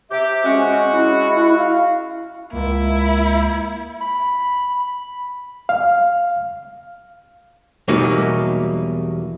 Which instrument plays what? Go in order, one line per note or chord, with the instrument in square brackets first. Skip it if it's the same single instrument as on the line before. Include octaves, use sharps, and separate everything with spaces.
[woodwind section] C3 G4 [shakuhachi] E5
[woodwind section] G#3 F#4 [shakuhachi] C#4
[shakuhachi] E4
F5
[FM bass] C#2 [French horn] A#3 [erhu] E4
[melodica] B5
[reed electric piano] F5
[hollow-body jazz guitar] E2 B2 F#3 G3 A#3 D#4